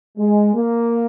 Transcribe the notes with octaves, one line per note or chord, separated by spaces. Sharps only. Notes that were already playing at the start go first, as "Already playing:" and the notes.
G#3
A#3